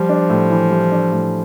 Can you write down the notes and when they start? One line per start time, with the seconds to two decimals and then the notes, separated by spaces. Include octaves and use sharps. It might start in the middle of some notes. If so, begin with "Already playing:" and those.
Already playing: F3 G3
0.09 D4
0.30 A2
0.50 E3
0.70 G3
0.92 D4
1.12 A2